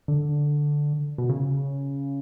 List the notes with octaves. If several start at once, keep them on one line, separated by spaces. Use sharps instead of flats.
D3
B2
C#3